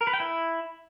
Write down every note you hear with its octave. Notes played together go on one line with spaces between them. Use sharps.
A#4
B4
G5
E4